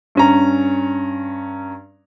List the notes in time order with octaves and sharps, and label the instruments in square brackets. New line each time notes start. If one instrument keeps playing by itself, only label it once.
[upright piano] G2 C#4 A#5